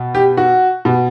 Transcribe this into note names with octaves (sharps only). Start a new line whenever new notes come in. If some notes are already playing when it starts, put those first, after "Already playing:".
Already playing: B2
G4
F#4
B2